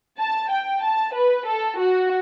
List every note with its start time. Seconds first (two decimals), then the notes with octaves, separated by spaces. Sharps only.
0.20 A5
0.52 G5
0.83 A5
1.15 B4
1.47 A4
1.80 F#4